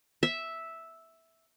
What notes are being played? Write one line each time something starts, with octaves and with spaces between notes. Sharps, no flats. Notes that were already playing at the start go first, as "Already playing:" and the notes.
E5